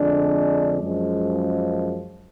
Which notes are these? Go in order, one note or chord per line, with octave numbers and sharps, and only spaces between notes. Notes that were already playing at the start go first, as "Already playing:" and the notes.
Already playing: F2 D3 G#3 D4
F#2 F3 G#3